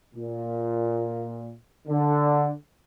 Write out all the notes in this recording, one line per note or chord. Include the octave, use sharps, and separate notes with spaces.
A#2
D3